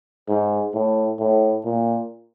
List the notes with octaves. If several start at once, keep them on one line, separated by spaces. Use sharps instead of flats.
G#2
A2
A2
A#2